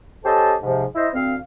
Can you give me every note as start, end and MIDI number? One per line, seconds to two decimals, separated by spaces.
0.25 0.54 61
0.25 0.54 67
0.25 0.54 69
0.25 0.54 72
0.25 0.54 75
0.25 0.54 81
0.63 0.85 44
0.63 0.85 48
0.63 0.85 53
0.96 1.08 64
0.96 1.08 72
0.96 1.08 75
1.13 1.36 38
1.13 1.36 60
1.13 1.36 77